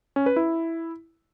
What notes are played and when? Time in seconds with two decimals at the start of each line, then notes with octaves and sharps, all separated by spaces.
0.16 C#4
0.26 B4
0.36 E4